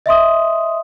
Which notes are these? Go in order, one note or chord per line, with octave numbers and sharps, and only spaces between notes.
D#5 E5 C6 D#6